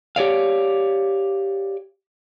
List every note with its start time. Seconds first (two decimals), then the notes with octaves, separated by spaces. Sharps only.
0.16 G4 C#5 D5 F5